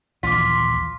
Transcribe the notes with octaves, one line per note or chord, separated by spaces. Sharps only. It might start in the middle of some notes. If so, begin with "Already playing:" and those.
A#1 D#2 E3 F4 D6 B6